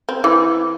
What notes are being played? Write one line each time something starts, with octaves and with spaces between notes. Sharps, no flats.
C4
E3